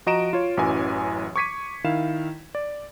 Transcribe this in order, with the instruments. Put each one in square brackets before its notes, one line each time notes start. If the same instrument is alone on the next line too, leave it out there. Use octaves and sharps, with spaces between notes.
[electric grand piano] F3 F#4 D#5 A#5 D7 E7
F4 C#5
A1 F#2 E3 F#3 G#5
C#6 D6 G#6 B6 C#7 D#7
D#3 E4 F5 E7
D5